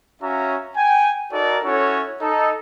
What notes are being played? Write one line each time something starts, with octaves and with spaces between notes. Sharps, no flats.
C#4 F#4 E5 F5 A#5
G5 G#5
D#4 F#4 A4 A#4 D5
C#4 E4 F#4 A4 C#5
D#4 A4